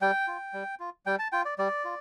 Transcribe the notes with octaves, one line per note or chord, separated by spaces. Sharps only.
G3 G5
F4
G3
F4
G3 G5
A5
F4 G5
D5
G3 D5
F4